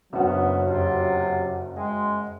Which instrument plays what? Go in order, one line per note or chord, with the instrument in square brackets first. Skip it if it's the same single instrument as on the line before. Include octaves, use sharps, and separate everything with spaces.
[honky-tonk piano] F#1 F#4 [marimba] F#2 C#3 D4 [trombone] F#3 [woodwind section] B3
[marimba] F2 F6 [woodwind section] C3 F4
[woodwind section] G#3 [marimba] G5